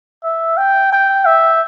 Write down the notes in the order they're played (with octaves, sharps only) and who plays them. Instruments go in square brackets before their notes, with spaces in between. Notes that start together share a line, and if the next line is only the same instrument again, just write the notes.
[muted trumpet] E5
G5
G5
E5